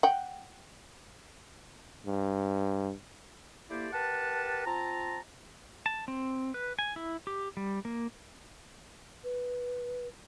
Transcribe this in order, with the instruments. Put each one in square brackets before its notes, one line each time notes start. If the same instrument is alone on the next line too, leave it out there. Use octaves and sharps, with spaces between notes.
[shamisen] F#5 G5
[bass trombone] G2
[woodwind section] A3 A#3 E4 G4 C5 D5
G4 A#4 B4 F#5 A5
C4 F4 A5 A#5
[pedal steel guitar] A5
C4
B4
G#5
E4
G4
G3
A#3
[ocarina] B4